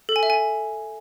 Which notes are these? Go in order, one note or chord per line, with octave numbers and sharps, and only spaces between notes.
A4
G#5
E5
G#5